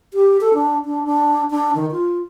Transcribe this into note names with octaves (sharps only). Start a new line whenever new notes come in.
G4
A4
D4
D4
D4
D4
D#3
F4